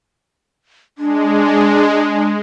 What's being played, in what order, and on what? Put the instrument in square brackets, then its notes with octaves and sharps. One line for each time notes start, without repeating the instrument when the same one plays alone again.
[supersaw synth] G#3 [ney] D4